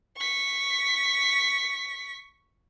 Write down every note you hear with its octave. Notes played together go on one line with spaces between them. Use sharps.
C#6 B6